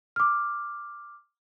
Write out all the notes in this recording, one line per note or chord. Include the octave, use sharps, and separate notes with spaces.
D6 F6